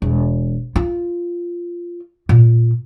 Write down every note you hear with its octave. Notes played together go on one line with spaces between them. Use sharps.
E1
F4
A#2